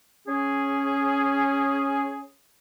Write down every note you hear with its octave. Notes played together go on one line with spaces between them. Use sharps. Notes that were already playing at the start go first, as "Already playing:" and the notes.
C#4 G#4